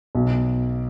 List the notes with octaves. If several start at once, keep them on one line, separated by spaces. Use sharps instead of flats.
B1